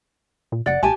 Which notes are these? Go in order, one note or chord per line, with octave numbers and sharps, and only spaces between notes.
A#2
F#1 D5 F#5
A#1 G4 G#5 A5